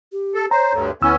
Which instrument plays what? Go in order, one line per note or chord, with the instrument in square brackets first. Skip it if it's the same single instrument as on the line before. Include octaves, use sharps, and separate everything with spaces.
[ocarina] G4
[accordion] A4
[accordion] C5 [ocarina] C#5 [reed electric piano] A#5
[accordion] D2 G2 D3
[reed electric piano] D2 E6 [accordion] B3 C#4 [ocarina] E4